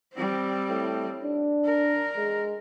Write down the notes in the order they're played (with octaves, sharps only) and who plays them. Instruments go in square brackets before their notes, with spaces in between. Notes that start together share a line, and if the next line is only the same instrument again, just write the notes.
[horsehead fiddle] G3 C4
[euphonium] A2
D4
[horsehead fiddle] A#4
[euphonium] G#3